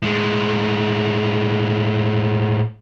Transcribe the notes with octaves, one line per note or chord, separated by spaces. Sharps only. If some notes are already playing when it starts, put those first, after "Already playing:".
A2 G#3